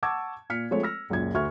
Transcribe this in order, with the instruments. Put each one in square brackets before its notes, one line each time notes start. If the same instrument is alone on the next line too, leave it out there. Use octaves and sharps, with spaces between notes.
[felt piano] F#5 A5 C#6 D6 E6 G#6
A#2 F6 B6 C#7
F3 G#3 A3 C4 A4 C#5
E6 F6 A#6
C#2 F#2 A#2 G#6
D2 F#4 E5 C#6 F6 G#6